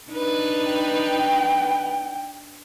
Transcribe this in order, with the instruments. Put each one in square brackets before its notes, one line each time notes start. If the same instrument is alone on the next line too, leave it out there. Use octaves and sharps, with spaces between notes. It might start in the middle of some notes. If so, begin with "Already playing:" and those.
[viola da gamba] D4 D#4 B4
[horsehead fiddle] G5